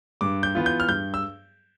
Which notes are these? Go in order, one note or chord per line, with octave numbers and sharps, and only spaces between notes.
G2 D6
G6
E3 B3 F4
G6
F6
G2 G6
E6